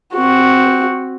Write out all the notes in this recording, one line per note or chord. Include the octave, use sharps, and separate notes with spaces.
C4 F#4